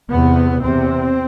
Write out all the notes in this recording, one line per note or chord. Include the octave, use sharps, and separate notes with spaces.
E2 C3 B3
E2 C3 C4